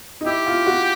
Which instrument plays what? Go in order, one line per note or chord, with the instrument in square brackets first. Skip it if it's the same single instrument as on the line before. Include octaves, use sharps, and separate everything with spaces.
[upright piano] D#4
[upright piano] E4 [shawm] G4
[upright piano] F4
F#4